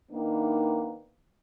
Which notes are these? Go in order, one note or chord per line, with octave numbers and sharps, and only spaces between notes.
D#3 A#3 B3 D4 E4